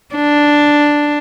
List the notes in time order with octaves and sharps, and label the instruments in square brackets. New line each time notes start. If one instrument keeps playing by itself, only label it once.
[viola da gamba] D4